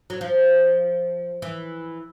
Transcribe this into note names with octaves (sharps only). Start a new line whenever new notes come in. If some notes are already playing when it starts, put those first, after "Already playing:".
F#3
F3
E3